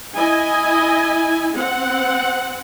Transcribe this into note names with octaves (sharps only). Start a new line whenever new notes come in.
E4 D#5 G#5
C4 F#5